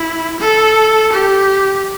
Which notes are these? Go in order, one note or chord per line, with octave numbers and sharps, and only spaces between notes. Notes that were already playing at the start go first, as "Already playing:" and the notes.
Already playing: E4
A4
G4